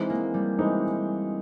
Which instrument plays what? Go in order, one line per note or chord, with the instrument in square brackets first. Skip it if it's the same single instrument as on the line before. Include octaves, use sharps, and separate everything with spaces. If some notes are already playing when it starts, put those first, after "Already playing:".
Already playing: [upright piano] E3 G#3 C4 D#4
[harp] A#3
G3
[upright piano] E3 G#3 C4 D#4